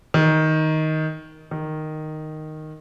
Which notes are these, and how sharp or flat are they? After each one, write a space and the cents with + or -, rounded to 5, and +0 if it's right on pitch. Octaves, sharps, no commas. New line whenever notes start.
D#3 +10
D#3 -5